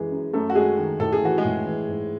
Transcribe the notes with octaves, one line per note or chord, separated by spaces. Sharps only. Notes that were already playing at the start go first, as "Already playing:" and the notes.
Already playing: F#2 E3 G#3 G#4
F#2
F#2 A3 A4
F#4
F#2 G#3 G#4
D#3
A2 A4
G#4
E3 F#4
G#3 G#4
A2
E3
G#2